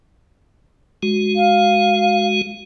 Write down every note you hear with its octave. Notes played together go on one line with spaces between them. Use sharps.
G#3 F#4
F5